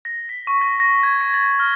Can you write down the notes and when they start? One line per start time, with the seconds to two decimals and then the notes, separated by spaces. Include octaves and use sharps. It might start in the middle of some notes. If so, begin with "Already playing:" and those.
0.05 A#6
0.29 B6
0.47 C#6
0.62 A#6
0.80 A#6
1.03 G#6
1.21 A#6
1.34 A6
1.59 F6